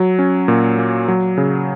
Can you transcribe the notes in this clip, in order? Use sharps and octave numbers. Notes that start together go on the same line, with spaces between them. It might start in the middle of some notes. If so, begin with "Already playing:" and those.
Already playing: F#3
C#4
A#2
A#3
F#3
C#3